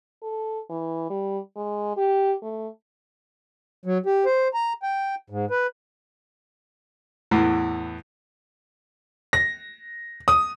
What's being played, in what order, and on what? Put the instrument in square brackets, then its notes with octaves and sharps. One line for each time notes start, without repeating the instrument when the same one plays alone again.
[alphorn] A4
E3
G3
G#3
G4
A3
[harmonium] F#3
G4
C5
A#5
G5
G#2
B4
[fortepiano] E2 A2 E3
[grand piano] A#6
D#6